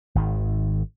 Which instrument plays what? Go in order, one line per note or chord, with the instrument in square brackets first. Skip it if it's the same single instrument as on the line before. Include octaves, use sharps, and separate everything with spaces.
[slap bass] G#1 D#3